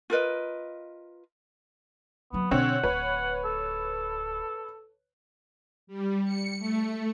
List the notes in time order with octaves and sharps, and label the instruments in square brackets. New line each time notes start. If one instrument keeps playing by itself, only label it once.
[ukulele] F4 A#4 B4 D#5
[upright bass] F#3 A#3 [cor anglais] B3
[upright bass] B2 C#4 [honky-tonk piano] D3 C4 C#5 [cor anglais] F#5
[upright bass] D1 [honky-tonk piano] B4 C#5
[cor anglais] A4
[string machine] G3
C#7
A3